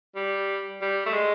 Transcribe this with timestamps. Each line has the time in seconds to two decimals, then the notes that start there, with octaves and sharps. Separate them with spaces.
0.16 G3
0.82 G3
1.06 A3
1.14 G#3